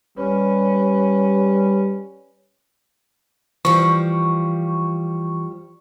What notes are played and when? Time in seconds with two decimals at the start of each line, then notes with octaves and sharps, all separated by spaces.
0.18 G3 C#4 B4
3.65 E3 F3 G3 C#6